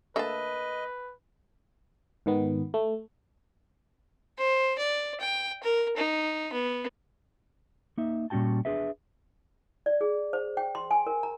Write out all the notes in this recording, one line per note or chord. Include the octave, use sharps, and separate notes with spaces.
D3 A3 A#3 B4 D#5 E5 A5
G#2 D#3 B3
A3
C5
D5
G5
A#4
D#4
B3
A#3 D#4 E5
A#2 G3 C#4 F#4 G5 A5
D4 G#4 B4 E5
D5
G#4
C5
G5
C6
G#5
A#4
A#5